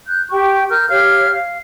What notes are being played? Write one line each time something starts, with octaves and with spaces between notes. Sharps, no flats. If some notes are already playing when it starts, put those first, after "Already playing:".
F#6 G6
G4 G5 C#6
A#4 F6 G6
G4 C#5 F5 F6
F5